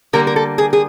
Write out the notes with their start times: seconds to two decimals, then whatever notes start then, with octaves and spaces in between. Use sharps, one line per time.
0.13 D3 G3 A#3 A#4
0.27 A#4
0.36 A4
0.58 G#4
0.73 G#4